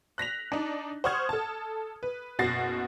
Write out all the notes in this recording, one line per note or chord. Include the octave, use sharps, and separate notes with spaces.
F#6 A#6 B6 F7
D4 D#4
C5 F#5 C#6 D#6 F6 G#6
A4 A5
B4
F#1 B2 F#4 A6 A#6 C7